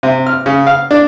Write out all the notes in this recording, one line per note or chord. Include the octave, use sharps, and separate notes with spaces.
C3
F6
C#3
F5
D4